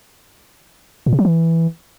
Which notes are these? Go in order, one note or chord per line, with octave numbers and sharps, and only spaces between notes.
A#2
C3
F#3
E3